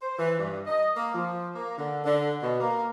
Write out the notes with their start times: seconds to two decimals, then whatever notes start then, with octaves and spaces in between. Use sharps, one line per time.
0.02 C5
0.19 E3
0.38 G2
0.67 D#5
0.97 A#3
1.14 F3
1.55 A#3
1.78 D3
2.04 D3
2.42 B2
2.61 A#3